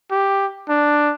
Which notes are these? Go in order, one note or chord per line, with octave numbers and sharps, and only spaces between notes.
G4
D4